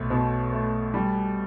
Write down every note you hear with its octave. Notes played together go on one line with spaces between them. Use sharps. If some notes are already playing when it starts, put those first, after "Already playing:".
Already playing: B1 A3
B2
A3
G3